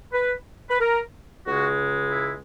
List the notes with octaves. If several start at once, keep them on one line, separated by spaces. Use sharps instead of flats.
B4
B4
A#4
C#2 C#3 G#3 F#4
E4